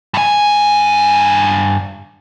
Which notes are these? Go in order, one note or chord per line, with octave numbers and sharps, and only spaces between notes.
G2 G#5